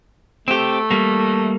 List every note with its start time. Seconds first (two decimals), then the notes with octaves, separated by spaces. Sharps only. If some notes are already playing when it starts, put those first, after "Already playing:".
0.48 A3 C4 G4
0.91 G3 A#3